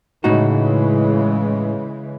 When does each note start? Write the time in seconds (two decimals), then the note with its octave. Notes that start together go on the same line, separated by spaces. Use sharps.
0.24 A2 C#3 E3 G#3 D#4 F#4